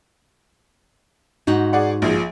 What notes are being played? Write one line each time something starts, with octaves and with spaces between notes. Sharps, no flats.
G#2 D#4 F#4
G#4 D5 F#5
A#1 F3 G#4